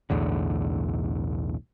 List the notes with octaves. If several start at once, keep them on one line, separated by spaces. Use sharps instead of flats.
B1 E2 A2 D3